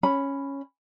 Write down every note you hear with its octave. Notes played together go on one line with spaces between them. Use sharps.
C#4 B5